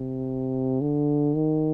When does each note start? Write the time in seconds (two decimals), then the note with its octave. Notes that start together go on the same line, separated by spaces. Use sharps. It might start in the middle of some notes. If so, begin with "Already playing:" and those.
Already playing: C3
0.81 D3
1.35 D#3